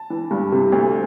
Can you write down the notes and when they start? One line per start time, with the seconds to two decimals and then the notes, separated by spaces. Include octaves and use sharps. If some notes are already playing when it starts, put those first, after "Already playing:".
Already playing: A5
0.10 E3
0.31 G2
0.52 C3
0.72 D2